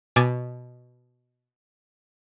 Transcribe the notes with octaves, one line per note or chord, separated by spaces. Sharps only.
B2 G#5 D6 G#6 A6